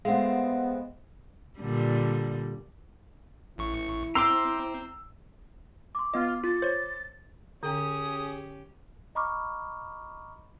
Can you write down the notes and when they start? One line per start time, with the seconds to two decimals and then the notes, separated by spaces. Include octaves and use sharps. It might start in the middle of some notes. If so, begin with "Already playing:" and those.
0.05 G#3 A3 B3 C4 F5 F#5
1.59 A#2 D3 G3
3.58 A1 E4 C#6
4.15 C4 A#5 C6 D6 E6
5.95 C6 D6
6.14 B3 F4 D#5
6.44 F4 A6
6.62 C5 C#5
7.63 D3 C#4 G4 G#4 G5 D#6
9.15 D#5 A#5 B5 C#6 D6 F6